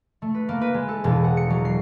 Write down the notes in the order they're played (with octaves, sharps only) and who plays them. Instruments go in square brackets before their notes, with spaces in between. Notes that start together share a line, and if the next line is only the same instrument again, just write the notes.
[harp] A3
B4
A#3
B4
G#3
A4
E1
F#5
C#7
F#3
C7